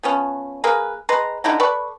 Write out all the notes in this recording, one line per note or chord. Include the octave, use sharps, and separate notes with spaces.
F3 B3 C#4
A#3 G#4 A#4 B4
G#3 B4 A#5 C6
D3 D#4 E4 A#5
A4 B4 D5 C#6